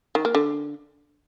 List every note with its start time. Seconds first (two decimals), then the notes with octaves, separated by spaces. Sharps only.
0.15 D#3
0.25 A#3
0.35 D3